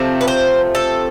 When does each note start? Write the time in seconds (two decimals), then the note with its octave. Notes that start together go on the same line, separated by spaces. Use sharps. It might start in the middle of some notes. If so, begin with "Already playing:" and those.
Already playing: C3 F3 A3 C4
0.21 B4
0.28 C5
0.75 A4